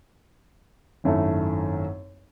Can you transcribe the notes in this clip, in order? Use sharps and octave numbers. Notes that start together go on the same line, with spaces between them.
G#1 F#2 A3 D#4 E4